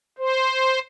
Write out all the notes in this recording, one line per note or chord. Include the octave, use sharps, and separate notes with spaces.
C5